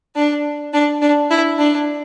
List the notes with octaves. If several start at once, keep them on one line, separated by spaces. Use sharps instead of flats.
D4
D4
D4
E4
D4